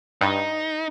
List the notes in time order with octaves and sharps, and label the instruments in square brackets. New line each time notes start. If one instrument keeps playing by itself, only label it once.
[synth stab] G2 [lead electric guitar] D#4